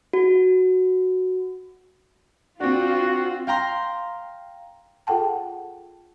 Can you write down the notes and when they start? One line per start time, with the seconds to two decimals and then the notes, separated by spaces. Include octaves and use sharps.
0.13 F#4
2.61 C4 D4 F4 F#4
3.47 F5 G5 A#5 C6
5.07 F4 G#4 A4 F#5 G5 A5